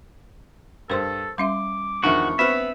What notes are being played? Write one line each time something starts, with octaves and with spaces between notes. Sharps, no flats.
G2 A4 A#4 C5 C6
G3 C#4 E5 C6 D6
E2 D#3 F3 D4 F#4 E5 C#6
B3 C4 B4 E5 B5 F6